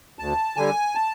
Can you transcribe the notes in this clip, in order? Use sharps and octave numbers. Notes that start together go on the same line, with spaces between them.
D2 A5
D3 G3 G#5
A5